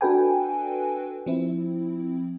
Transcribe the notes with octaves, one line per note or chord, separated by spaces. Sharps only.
D4 F#4 A4 B4 G5 G#5
F3 C4 E4